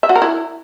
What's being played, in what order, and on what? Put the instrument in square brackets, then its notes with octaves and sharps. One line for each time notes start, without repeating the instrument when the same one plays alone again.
[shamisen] E5
F#4
A#4
E4